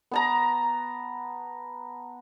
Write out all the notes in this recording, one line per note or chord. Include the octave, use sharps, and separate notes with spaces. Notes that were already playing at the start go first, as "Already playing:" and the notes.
B3 A5 A#5